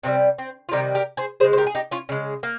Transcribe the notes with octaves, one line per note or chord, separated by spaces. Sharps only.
C3 D#3 G3 C4
C4
F4
C3 D#3 G3 D#4 G4
G4 A#4
G#4 C5
C#3 G#3 G#4 C5
C5
G4 A#4
G#4
D#4 G4
C#4 F4
C#3 G#3
A#3